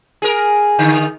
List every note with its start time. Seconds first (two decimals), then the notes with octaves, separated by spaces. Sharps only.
0.22 G#4 A#4
0.79 D3 D#3